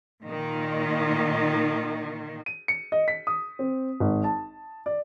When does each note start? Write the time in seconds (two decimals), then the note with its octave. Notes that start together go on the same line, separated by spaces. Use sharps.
0.22 A#2 D#3
2.46 D#7
2.68 C#7
2.92 D#5
3.08 B6
3.27 D#6
3.59 C4
4.00 G#1
4.24 A5
4.86 D5